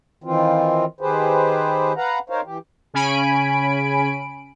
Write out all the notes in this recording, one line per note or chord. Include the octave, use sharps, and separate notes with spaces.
D#3 E3 C4 F4
D#3 G4 G#4 B4 C5
B4 F5 F#5 A#5
D#4 A#4 C5 C#5 F5
E3 G4
C#3 C#4 G#5 B5 D7